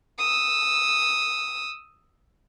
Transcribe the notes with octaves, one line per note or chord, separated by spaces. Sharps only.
D#6 E6